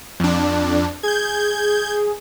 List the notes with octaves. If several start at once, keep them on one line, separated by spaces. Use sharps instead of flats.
F2 D4
G#4 G6 G#6